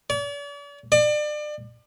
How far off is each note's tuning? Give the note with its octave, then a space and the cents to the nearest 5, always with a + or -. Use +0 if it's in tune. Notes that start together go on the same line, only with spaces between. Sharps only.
D5 -45
D5 +30